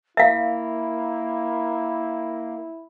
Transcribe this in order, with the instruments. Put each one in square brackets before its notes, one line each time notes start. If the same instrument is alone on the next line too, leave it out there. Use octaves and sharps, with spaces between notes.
[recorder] A#3 [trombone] E4 [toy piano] E5 F5